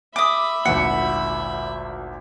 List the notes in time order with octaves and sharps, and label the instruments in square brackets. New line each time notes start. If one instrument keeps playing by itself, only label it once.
[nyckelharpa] E5 B5 [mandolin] D6 D#6
[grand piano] G#1 D2 A#2 [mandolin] F#5